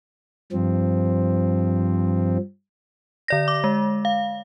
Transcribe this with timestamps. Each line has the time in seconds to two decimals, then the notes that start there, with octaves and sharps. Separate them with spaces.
0.52 G2 F3 C4
3.28 D3 D5 A#6
3.48 D6
3.64 G#3
4.05 F5